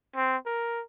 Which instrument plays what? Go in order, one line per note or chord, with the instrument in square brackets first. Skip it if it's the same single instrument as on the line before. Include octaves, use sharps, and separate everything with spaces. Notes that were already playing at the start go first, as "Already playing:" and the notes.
[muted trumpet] C4
[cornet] A#4